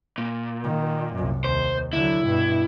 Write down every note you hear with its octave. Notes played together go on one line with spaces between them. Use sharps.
A#2
D#3
C2 F#2
D#2 C5
D3 F#3 E4
G2 B2